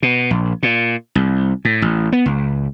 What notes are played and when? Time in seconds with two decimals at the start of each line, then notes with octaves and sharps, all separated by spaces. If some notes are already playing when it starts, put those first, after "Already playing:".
0.03 B2
0.31 A#1
0.63 A#2
1.15 C2
1.65 A2
1.82 A1
2.12 B3
2.26 C#2